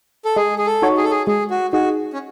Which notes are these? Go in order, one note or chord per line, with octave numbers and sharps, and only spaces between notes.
A4
G#3 G#4
G#4
A4
D#4 F#4 C#5
G#4
A4
G#4
G#3 G#4
F#4
D#4 F#4 G#4
C#4